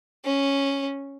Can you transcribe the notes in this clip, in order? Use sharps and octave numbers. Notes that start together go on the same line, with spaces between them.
C#4